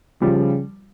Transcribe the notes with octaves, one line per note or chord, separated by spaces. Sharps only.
C#3 F3 G3